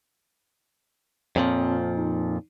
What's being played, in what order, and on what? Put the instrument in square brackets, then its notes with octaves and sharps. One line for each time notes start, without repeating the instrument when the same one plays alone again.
[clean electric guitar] F2 A#2 F3 [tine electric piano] C4 C#5
[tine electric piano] D#4